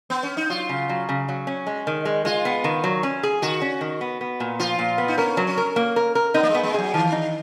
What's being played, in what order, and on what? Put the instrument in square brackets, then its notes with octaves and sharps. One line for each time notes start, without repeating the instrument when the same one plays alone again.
[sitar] B3
C#4
D#4
[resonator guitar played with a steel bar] F#3 [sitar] F4
[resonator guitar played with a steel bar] C#3
F#3
C#3
F#3
C#4
G#3
D#3
G#3
[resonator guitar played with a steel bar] G#3 [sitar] F4
[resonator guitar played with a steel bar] B3
D#3
F#3
C#4
G#4
[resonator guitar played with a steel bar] D#3 [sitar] F#4
[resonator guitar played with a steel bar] C#4
D#3
B3
B3
A#2
[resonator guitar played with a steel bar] F3 [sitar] F4
[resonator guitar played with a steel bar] A#2
B3
[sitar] D#4
[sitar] C#4 [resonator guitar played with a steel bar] A#4
[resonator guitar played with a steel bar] F#3
[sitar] C#4
[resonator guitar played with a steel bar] A#4
A#3
A#4
A#4
[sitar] B3 [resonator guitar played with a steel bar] D#4
[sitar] A#3
G#3
[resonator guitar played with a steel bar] B3
[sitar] G#3
[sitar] F#3 [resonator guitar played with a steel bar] G#4
[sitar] D#3 [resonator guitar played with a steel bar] F3
[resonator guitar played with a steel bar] D#4